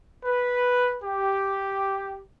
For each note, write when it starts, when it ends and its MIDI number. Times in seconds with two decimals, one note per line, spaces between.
0.25 0.96 71
1.03 2.21 67